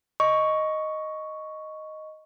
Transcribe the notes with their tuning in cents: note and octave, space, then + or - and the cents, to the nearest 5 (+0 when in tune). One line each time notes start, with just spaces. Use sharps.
D#5 +0 C#6 +5